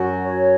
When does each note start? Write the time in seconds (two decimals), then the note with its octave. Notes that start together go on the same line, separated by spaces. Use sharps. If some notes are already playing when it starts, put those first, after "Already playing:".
Already playing: F#2 F#3 F#4
0.22 C#5